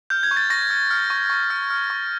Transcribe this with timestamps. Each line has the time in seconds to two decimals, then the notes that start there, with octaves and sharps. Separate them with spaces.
0.10 F6 G6
0.23 G#6
0.31 C#6
0.37 A6
0.50 C#6 A#6
0.70 F6
0.91 F6
1.10 C#6
1.30 C#6
1.50 F6
1.70 F6
1.90 C#6